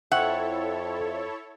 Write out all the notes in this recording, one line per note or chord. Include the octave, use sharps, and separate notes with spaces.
F2 E4 A4 C#5 E5 F#5 G5 C#6